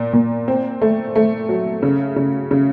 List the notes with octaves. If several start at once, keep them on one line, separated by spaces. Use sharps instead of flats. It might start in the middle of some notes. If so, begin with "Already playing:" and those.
Already playing: A#2
A#2
C4
A3
A3
F#3
C#3
C#3
C#3